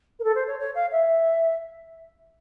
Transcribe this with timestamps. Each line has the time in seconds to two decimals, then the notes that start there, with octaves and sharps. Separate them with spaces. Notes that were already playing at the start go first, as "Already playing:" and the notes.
0.19 A#4
0.24 A4
0.35 C5
0.47 C#5
0.60 C#5
0.75 F5
0.92 E5